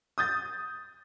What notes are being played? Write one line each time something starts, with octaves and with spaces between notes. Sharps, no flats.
D#6 G6 A6